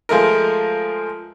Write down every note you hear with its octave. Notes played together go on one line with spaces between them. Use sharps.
F3 G#3 A3 A#4